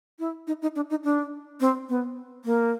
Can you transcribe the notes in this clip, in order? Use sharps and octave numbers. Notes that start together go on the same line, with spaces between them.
E4
D#4
D#4
D4
D#4
D4
C4
B3
A#3